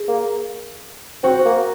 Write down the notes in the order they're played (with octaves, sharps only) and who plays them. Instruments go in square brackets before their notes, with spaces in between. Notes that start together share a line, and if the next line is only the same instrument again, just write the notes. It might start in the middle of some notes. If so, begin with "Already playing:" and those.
Already playing: [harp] G#4
[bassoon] A#3
[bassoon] C4 [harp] F#4
[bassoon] A#3